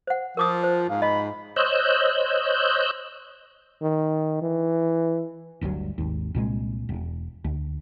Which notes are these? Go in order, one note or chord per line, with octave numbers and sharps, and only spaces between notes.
C5 F#5
F3 F4 A#4 D6 D#6
C5
G#2 F5
D#5 B5
C5 C#5 D#5 E6 F#6 G6
D#3
E3
G1 D2 G2 F#3
G#1 D#2
C2 A#2 G#3
E1
D2